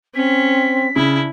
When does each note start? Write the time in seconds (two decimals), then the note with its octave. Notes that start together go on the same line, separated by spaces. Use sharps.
0.15 C4 C#4 B6
0.96 C#3 D4 E4